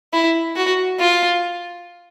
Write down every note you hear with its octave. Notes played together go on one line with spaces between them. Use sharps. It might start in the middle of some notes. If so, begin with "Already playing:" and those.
E4
F#4
F4